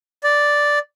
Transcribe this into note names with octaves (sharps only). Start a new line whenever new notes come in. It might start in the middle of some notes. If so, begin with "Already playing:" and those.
D5